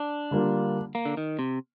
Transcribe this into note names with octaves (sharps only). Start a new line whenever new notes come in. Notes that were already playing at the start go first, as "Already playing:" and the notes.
Already playing: D4
D3 G3 A#3 F4
A#3
D3
D#3
C3